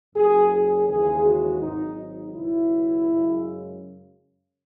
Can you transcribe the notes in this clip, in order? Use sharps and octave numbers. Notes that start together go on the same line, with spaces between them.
F#1 F#2 C#3 G#4
G#4
D#2 C#3 E3 G#3 G#4
F#4
G#1 G#2 F#3 D#4
D#4
C#2 B2 F#3 E4
F#2 C#3 G#3